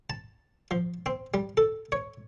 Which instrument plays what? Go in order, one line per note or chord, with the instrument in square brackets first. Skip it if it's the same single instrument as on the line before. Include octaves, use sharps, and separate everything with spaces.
[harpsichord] A5
F3
C4
G3
A4
C#5